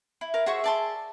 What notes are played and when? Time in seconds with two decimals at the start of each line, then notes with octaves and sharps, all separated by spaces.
0.21 E4
0.34 A#4 F5
0.46 F#4 G#4 C5 E5 C#6
0.64 D5 A5 C6